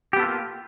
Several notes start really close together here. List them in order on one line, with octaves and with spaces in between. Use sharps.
G4 B3 A4 F4 A#3